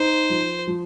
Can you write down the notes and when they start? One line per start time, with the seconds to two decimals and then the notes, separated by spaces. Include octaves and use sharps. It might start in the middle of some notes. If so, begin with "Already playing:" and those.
Already playing: D#4 C5
0.30 F3
0.67 F3